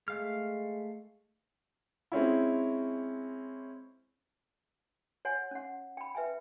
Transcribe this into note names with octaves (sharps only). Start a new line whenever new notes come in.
G#3 A3 F5 F6
G#3 C4 C#4 E4
C#5 F#5 G#5
C#4 F#5
G5 B5
B4 E5 G5 G#5